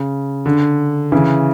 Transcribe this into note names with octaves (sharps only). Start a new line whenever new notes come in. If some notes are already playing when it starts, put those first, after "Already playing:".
Already playing: C#3
D3
C#3 E3